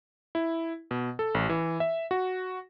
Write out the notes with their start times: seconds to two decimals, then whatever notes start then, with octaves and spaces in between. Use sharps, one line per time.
0.35 E4
0.91 B2
1.19 A4
1.34 A1
1.49 E3
1.80 E5
2.11 F#4